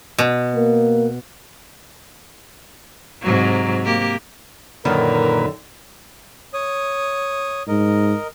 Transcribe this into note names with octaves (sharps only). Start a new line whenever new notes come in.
B2
A#3
G#2 C3 F#3
A#3 G4
F#2 A#2 D3 D#3 A#4 B4
C#5 D#6
G#2 A#4 D#5